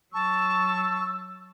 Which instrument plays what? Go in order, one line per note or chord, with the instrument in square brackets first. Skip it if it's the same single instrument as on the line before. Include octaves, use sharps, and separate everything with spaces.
[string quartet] F#3 [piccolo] A5 [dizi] C#6 [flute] E6